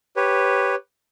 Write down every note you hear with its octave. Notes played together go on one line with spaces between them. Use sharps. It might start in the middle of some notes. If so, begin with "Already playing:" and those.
G4 B4 C#5